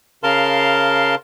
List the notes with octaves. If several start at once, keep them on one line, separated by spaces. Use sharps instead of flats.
C#3 A#4 F5 A5 C6